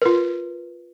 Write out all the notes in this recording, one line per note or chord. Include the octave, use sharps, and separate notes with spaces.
F4 A#4 B4